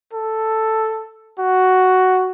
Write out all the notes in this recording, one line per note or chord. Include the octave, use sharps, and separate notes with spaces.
A4
F#4